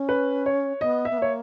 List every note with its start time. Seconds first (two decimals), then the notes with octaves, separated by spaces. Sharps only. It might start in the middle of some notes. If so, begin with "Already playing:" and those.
Already playing: C#4
0.09 B4
0.46 C#5
0.81 B3 D#5
1.05 E5
1.11 B3
1.18 A#3 C#5